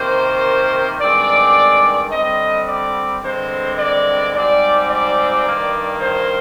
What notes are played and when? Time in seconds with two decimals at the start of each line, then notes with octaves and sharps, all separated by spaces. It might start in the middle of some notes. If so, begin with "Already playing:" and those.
Already playing: C3 D#3 A#3 C5
1.00 G2 D#3 G#3 C4 D5
2.11 D3 G3 C4 D#5
2.67 D5
3.23 G2 D3 G#3 C4 C5
3.78 D5
4.34 G#2 G3 C4 D5
4.89 D5
5.45 G2 D#3 A#3
6.01 C5